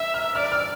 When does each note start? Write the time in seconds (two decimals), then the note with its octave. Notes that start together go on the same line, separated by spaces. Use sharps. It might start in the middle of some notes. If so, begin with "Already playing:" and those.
Already playing: E5 E6
0.14 F6
0.35 D5 F6
0.52 F6